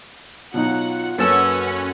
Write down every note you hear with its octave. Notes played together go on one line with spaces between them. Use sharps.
B2 F#3 D#4 F4 F#5
F#2 A#3 C#4 A4 B4 F#5 E6